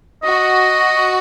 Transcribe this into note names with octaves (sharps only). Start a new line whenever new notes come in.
F#4 D#5